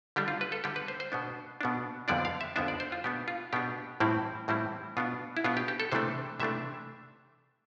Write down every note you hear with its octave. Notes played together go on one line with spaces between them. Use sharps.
D3 G3 D4 G4
F4
B4
A4
D3 G3 D4 G4
B4
C5
C5
B2 B3 D4
B2 B3 D4
F2 D3 F3 B3 D4 D5
F5
E5
F2 D3 F3 B3 D4 E5
D5
C5
F4
B2 B3 D4 G4
F4
B2 B3 D4 G4
A2 E3 G3 C4 E4
A2 E3 G3 C4 E4
B2 B3 D4 F4
E4
B2 B3 D4 F4
G4
G4
A4
C3 E3 A3 D4 C5
C3 E3 A3 D4 E5